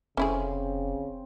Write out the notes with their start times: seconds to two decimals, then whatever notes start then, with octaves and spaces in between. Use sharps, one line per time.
0.17 F1 C#3 C4 C#4 E4 G#4